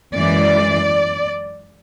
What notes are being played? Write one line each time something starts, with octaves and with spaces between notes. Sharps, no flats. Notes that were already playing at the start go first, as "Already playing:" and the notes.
F#2 E3 G#3 D5